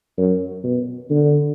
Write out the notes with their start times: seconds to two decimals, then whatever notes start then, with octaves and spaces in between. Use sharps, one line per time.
0.17 F#2
0.64 B2
1.10 D3